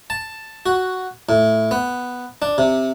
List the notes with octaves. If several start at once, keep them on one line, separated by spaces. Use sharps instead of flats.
A5
F#4
A2
B3
D4
C3